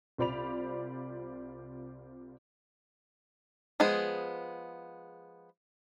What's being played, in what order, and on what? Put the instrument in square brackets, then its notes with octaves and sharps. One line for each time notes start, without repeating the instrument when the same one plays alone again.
[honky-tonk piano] C2 F4 C5 D5 B5 F7
[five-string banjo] F3 G#3 B3 G#4